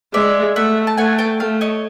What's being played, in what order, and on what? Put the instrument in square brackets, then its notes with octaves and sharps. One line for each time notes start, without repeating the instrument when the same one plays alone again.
[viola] G#3 [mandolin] D5 E5
[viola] A3 [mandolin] E5 F#5
[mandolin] A5
[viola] A3 [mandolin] F#5 G#5
[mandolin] G5 A5
[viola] A3 [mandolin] F5 G5
[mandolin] C#5 D#5